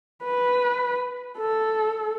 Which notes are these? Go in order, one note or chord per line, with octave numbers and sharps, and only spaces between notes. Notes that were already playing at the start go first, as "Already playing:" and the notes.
B4
A4